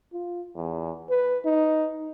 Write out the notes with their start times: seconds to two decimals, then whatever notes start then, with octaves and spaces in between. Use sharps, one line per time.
0.13 F4
0.56 E2
1.10 B4
1.45 D#4